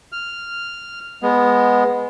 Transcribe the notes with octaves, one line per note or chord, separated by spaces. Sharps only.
F6
G#3 B3